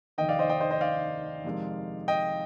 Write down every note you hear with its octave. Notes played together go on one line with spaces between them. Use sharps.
F1 D#2 D#3 D#5 G5
D5 F5
C5 D#5
D#5 G5
C5 D#5
C5 D#5
D5 F5
F2 C3 D#3 G#3
D#5 G5